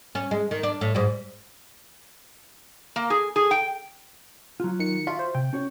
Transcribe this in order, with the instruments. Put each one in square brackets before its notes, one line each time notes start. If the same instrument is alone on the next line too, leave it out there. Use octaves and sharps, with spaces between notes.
[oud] C#4
G#3
D#3
D4
A2
G#2 G3
[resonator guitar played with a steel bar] A#3
G#4
G#4
G5
[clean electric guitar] F#3 F4
[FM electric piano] D#3 C#7
[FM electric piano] F4 [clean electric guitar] F#4 D5 E5
[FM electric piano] C5
[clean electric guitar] C3 [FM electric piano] G5
[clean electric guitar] C#4 F#4 C#5